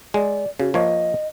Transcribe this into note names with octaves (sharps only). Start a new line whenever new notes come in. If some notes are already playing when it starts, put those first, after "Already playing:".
G#3 D5
C#3 F#4
F3 A#3 C#5 D#5